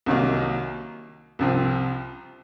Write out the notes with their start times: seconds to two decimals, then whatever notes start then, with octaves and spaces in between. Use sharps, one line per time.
0.06 C2 C3 D#3 F#3 A#3
1.39 C2 C3 F3 C4